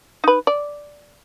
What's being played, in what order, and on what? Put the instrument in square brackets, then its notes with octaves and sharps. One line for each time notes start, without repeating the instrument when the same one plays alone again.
[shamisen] D#4 B4
D5